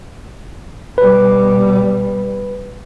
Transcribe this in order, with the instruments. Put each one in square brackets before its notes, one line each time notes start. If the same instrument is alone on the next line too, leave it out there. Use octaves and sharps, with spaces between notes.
[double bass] B2 G3 [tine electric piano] B4